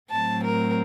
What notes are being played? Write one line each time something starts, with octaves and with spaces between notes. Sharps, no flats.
A2 F#3 C4 A5
A#4